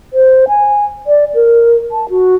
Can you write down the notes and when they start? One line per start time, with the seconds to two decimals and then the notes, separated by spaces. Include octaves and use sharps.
0.13 C5
0.48 G#5
1.07 D5
1.34 A#4
1.92 A5
2.09 F#4